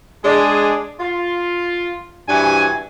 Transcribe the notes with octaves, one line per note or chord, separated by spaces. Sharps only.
G#3 D4 G#4
F4
G2 C3 E3 F#4 G#5